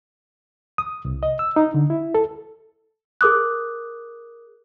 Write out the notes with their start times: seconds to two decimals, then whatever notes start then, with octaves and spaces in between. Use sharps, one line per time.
0.78 D#6
1.05 C2
1.23 D#5
1.39 E6
1.56 D#4
1.74 D3
1.90 E4
2.15 A4
3.21 G#4 A#4 D6 D#6 F#6